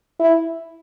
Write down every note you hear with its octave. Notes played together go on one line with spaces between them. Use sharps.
E4